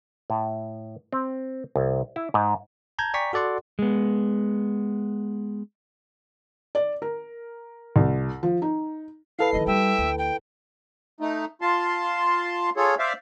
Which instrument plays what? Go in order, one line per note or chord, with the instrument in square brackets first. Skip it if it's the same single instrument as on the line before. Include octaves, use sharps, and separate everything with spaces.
[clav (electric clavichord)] A2
C4
C2
E4
G#2
[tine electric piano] A5 A#5 G6 G#6
D5 G5 G#5 A#5 C#6 B6
F#4 A4 D5 F#5 C6
[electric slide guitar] G#3 B3
[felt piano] D5
A#4
C2
F3
D#4
[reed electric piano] E4 A4 B4 [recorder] F5 [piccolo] C7
[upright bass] D#3 F3 [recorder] D#5
[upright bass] G3 [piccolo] E5 [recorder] G5
[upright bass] D2
[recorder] G5
[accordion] A3 D#4
F4 A5 C6
F4 G#4 A4 C#5
C5 D5 E5 F5